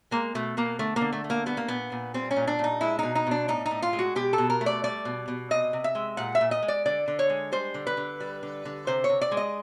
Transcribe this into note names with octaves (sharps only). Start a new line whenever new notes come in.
G#3 A#3
B2 A3
B2 A#3
D3 A3
D3 A#3
A3
A3
A#3
G3 B3
A#3
A#2 B3
A#2
G3 C4
C#4
A#2
D4
A#2 D#4
G#3 E4
B2 D#4
D#4
B2 D4
A2 D#4
D#4
A2
F4
G#3
F#4
B2 G4
A4
B2
A#4
A3
D5
G3 D5
B2
B2
C3 D#5
C3
E5
G#3
A#2 F#5
E5
A#2
D#5
G#3
D5
D3 D5
D3
C#5
G#3
G3 C5
D3
B4
D3
G3
D3
D3
C3 C5
C#5
C3
D5
G#3
D#5